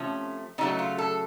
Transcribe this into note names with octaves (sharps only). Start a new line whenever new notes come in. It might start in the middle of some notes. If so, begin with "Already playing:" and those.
Already playing: C3 F3 A3 C#4
C#3 F#3 A3 D#4
F4
A4